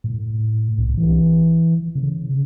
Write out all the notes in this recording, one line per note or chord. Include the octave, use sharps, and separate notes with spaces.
A2
C2
E3
C#3